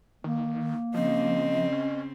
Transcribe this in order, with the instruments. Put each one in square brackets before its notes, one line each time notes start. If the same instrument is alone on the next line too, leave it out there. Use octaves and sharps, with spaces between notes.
[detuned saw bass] D#3 [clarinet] A#3
[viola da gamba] C#3 C4 [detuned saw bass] F3 [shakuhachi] D#5
[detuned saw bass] C#4